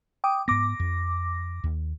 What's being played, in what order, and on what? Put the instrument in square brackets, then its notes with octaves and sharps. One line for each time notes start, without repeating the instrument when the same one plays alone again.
[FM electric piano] G5 D6 D#6
[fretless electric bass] G#2 B3 [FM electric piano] D6 A#6
[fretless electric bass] F2
D#2